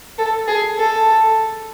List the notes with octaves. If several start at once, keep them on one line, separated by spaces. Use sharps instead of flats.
A4
G#4
A4